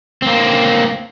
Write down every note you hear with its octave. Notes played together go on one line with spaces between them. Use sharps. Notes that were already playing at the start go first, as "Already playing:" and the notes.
A#3 C4